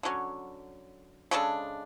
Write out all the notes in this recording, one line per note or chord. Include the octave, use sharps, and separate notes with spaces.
D3 F#3 C#4
C#3 G#3 D4 A4